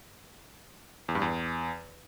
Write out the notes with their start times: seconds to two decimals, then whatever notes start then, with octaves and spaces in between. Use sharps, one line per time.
1.08 E2
1.15 G2
1.22 E2